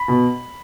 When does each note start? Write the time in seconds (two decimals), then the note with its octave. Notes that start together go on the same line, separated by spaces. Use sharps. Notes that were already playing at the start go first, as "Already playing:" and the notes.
Already playing: B5
0.08 B2